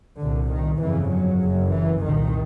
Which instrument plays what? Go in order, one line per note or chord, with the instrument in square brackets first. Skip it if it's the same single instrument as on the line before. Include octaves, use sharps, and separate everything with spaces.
[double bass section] C2 A#2 D3
D#3
G1 F2 C#3 E3
F#3
F#1 F#2 C#3
E3
C2 A#2 D#3